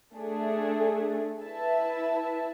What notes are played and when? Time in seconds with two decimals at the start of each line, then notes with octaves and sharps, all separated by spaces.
0.13 A3 D4 G#4
1.42 E4 B4 E5 A5